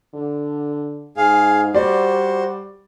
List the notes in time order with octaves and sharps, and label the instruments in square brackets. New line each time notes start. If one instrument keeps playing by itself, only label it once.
[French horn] D3
[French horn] G#2 [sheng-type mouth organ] G#4 F5
[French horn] G3 [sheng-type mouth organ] F#4 C5 [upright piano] D5